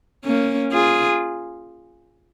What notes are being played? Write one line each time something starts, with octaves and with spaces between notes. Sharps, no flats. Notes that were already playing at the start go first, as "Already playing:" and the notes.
A#3 C#4
F4 G#4